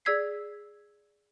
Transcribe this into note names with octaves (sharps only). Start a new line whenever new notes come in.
G#4 D5 E6 G#6 B6 C7